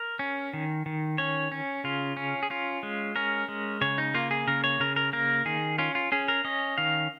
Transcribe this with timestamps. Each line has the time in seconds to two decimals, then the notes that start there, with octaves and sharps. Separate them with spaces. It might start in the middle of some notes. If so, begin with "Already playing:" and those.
Already playing: A#4
0.19 C#4
0.53 D#3
0.86 D#3
1.18 C#4 C#5
1.52 C#4
1.84 C#3 F4
2.17 C#4
2.43 G#4
2.50 C#4 F4
2.83 G#3
3.16 C#4 A#4
3.49 G#3
3.81 C#3 C#5
3.98 D#4
4.14 A#3 F4
4.31 G#4
4.47 C#3 A#4
4.64 C#5
4.80 C#3 A#4
4.96 A#4
5.13 A#3 A#4
5.45 D#3 G#4
5.78 C#4 F4
5.95 F4
6.12 C#4 G#4
6.28 A#4
6.45 C#4 D#5
6.78 D#3 F5